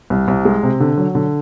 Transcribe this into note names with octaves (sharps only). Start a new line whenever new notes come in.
C2
C2
G#3
C3
D3
F#3
D3